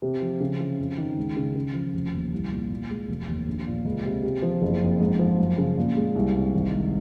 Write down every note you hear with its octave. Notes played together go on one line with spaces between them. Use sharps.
C3
F3
C#3
F3
F2
D#3
C#2
C#3
C#3
F3
F1
D#2
C2
A#2
A#2
G#3
F1
D#2
A#1
A#2
C#2
C3
C3
F3
F#1
F2
G#2
F3
F#2
C#3
A#2
G#3
C2
C3
G#1
G#2